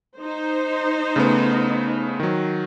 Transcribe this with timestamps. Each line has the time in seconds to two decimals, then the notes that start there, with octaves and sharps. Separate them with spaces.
0.17 D#4 C5
1.16 C#3 A3 B3
2.20 D#3 F#3